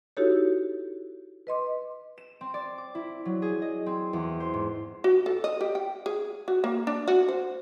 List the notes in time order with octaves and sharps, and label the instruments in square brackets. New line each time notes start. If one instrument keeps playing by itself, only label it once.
[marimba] D#4 E4 F#4 G4 A4 C#5
B4 D#5 C6 D6
[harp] E7
C4
D5
D6
E4
F#3
G#4
D#5
C4
E2
C5
G#2
[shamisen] F#4
A4
D#5
G4
G5
G#4
F#4
A#3
D4
F#4
C5